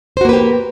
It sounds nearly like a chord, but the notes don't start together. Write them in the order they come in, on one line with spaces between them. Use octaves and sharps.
C5 F#4 A#3 B4 G4